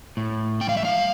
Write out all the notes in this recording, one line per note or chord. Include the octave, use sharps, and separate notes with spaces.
A2
G3 G5
F5
E5
F5